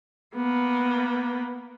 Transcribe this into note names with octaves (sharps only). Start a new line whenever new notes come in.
A#3 B3